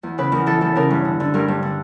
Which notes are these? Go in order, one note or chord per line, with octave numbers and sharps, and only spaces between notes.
E2
C#3 B4
E2 A#4
E3 A4
E2 A4
C#3 A#4
G2
D3
D3
G2 A#4
G2
D3